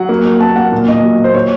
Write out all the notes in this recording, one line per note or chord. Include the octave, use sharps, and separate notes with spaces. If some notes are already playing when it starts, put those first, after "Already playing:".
Already playing: F#3 F#5
A#3
A#3
A#3 A5
A#3 F#5
A#2
A#2 D#5
F#3
A#2
C5
A#2 C#5